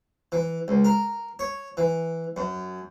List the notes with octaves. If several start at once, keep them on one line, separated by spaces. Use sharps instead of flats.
E3
C#2
A#4
C#5
E3
F#2